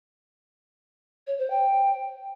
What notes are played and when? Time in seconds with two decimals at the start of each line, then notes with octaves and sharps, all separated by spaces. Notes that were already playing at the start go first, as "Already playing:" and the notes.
1.27 C#5
1.39 C5
1.50 G5